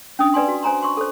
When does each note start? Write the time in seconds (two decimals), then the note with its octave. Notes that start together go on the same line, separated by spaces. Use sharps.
0.19 C#4 D4 D#6
0.34 B4 D5 G#5 C6
0.48 F#4
0.63 C5 G#5 A#5 C6
0.82 C6 C#6
0.97 A4 C5